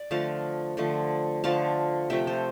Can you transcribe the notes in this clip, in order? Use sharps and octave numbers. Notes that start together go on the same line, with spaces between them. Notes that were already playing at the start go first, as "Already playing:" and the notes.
Already playing: D5
D3 F3 A3 F5 A5
D3 F3 A3
D3 F3 A3 F5 A5
C3 F3 A3 E5 G5
A4 C5